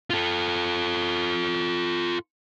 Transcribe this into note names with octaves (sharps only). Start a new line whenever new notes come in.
F4 A4